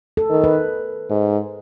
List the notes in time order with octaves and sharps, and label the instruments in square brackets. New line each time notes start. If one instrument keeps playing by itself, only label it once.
[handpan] A4
[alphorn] D#3
[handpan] B4
[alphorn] G#2